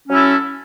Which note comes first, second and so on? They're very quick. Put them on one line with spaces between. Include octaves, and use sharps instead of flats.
C#4 F#3 E4 A4